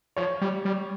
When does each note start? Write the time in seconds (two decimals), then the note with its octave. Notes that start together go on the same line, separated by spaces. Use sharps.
0.16 F3 C#5
0.41 G3
0.65 G3